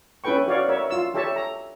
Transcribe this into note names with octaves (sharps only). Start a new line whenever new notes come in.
C#4 E4 A4 B4 G5 C#6
F#4 C#5 D5 F5
A#4 C#5 E5
F4 E6
G4 A4 C#5 E5 A5
A#5